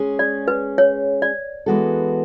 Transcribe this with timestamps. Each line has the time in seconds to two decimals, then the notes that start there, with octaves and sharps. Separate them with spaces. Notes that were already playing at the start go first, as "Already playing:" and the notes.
Already playing: G#3 C#4 G#4
0.19 D5
0.48 B4
0.78 C#5
1.22 D5
1.66 E3 G#3 B3 F#4 A4